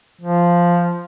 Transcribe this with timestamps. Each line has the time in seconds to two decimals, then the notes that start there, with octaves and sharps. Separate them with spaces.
0.21 F3